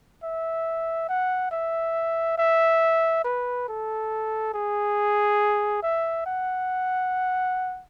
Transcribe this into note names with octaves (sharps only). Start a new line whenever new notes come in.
E5
F#5
E5
E5
B4
A4
G#4
E5
F#5